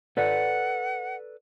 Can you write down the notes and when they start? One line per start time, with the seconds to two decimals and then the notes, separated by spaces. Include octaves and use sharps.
0.17 A4 B4 D5 F#5